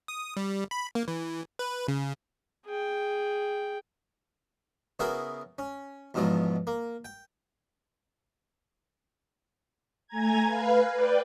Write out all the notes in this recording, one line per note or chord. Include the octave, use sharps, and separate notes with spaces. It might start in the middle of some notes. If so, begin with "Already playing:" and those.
D#6
G3
B5
A#3
E3
B4
C#3
G#4 G5
C#3 B3 E4 F#4 G#4 A#4
C#4
E2 G#2 B2 F3 F#3
A#3
G5
A3 G#5 A#5 G#6
B4 F5
B4 D5 G5